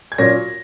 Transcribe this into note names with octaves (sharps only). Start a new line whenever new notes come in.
G#6
A#2 F#3 C#4 A#6